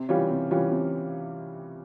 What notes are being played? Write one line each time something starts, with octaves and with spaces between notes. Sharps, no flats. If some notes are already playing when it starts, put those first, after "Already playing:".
Already playing: C3
E3 G3 C#4 F4
C3
E3 G3 C#4 F4
C3